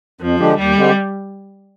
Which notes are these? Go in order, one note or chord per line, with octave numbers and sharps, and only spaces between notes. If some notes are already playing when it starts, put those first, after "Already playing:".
F2 F3
D3 G#3 D4 G4
D#2 G3
D3 G#3 C4 G4